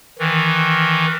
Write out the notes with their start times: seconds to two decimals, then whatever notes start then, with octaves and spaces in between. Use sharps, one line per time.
0.19 D#3 E3